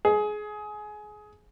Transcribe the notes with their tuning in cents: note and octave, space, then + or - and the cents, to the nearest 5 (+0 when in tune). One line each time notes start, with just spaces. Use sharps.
G#4 +20